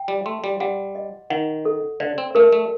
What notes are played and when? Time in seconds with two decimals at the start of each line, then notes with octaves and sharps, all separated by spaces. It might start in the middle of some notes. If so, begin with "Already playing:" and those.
Already playing: G5
0.08 G3
0.26 A3 C6
0.44 G3
0.60 G3 F#5
0.95 D#5
1.30 D#3 F#5
1.65 A4
2.00 D3 D5
2.18 C4
2.35 A3 A#4
2.53 A3